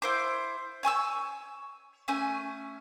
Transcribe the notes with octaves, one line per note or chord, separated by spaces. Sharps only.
E4 C5 D6
C#5 G#5 C#6 E6
A3 C#4 G#5